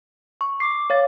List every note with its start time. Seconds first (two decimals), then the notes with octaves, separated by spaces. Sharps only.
0.41 C#6
0.60 D6 C7
0.90 C#5 F5 A6